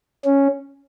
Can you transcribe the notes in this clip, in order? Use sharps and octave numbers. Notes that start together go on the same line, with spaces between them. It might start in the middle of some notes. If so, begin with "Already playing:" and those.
C#4